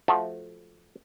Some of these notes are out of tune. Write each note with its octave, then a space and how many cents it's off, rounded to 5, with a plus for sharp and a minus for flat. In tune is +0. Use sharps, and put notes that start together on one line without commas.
F3 +0 A3 -15 F#4 +0